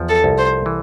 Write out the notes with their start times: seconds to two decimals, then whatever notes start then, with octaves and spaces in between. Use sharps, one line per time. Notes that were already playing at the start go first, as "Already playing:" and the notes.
Already playing: E2 F3
0.09 A4
0.24 C2
0.38 C5
0.66 E3